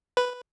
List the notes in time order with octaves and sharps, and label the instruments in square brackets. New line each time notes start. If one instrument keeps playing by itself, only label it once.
[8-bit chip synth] B4